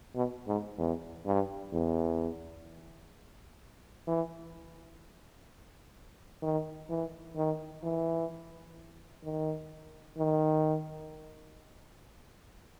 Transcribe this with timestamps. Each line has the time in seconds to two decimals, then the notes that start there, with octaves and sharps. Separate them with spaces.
0.15 B2
0.47 G#2
0.78 E2
1.26 G2
1.73 E2
4.07 E3
6.43 D#3
6.89 E3
7.36 D#3
7.83 E3
9.24 D#3
10.18 D#3